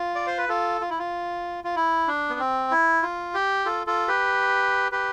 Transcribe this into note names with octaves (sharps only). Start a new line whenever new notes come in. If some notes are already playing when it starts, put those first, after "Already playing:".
Already playing: F4
D5
C5
B4
F4 A4
F4
E4
F4
F4
E4
D4
B3
C4
E4
F4
G4
F4 A4
F4 A4
G4 B4
G4 B4